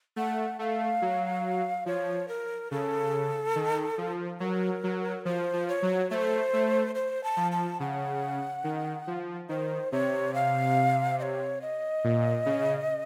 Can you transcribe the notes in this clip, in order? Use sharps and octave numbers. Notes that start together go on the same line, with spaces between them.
A3 F#5
A3 F5 F#5
F#3
F3 C#5
A#4
C#3 A4
D#3
F3
F#3 A#4
F#3
F3 C5
F3
C#5
F#3
A3 C5 C#5
A3
C5
A5
F3
A5
C#3 F#5
D#3
F3
D#3 C5
C3 C#5
F5
D#5
C#5
D#5
A#2
C#3